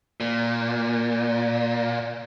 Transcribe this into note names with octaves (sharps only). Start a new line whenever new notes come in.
A#2